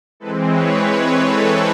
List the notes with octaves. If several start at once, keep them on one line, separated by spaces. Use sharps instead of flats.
E3 G#3 C4 A4 B4
B4 C#5
B4 C#5
A4 B4